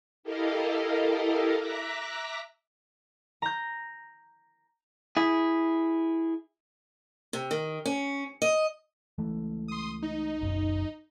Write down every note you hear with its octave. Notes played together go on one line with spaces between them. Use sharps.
E4 G4 A4 A#4 D#5 F5
E5 A#5 D6 F#6 A#6 B6
A#5 G6
E4 G#4
C3
D#3
C#4
D#5
C#2 E3 A3
C6 D#6
D#4
F#1 B1 F#2